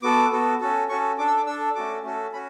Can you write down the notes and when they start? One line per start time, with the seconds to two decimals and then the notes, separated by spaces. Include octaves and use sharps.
0.03 B3 F#4 A4 D6
0.31 B3 F#4 A4
0.61 C#4 F#4 A4
0.89 C#4 F#4 A4 C#6
1.18 D4 A4 D6
1.27 E6
1.37 D6
1.46 D4 A4 E6
1.75 A3 C#4 F#4 A4 D6
2.03 A3 C#4 F#4 A4
2.32 C#4 F#4 B5